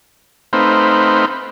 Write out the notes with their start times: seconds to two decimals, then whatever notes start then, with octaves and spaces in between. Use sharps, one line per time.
0.53 A3 C4 D#4 B4 C5 F5